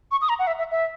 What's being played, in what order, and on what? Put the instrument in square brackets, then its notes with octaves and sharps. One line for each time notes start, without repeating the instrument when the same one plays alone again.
[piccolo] C#6
D#6
A#5
F#5
E5
E5
E5